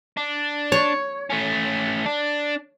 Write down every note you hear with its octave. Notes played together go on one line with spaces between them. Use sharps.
D4
C#5
A3 C#4
D4